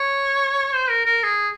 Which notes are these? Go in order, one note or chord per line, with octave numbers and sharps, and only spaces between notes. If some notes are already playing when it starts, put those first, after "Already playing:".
Already playing: C#5
C5
A#4
A#4
G#4